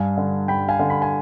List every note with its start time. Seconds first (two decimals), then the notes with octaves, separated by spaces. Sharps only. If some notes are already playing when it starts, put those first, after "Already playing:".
Already playing: G2 F5 G#5
0.17 D3
0.48 G2 G5 B5
0.68 F5 G#5
0.79 D3
0.90 B5
1.02 G#5